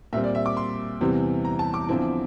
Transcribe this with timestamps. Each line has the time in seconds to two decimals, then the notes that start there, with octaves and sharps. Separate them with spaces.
0.13 A#2 G3 C4 E5
0.24 D5
0.35 E5
0.46 D6
0.57 C6
1.01 E2 C3 E3 G3 C4
1.45 A#5
1.59 A5
1.74 D6
1.89 E2 D3 F3 C4 E4